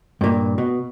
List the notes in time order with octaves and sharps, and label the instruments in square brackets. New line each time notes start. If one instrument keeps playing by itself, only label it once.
[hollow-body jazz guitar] G2 A#2
B2